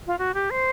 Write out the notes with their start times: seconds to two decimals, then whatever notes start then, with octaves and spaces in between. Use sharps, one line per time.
0.07 F4
0.19 F#4
0.34 G4
0.51 C5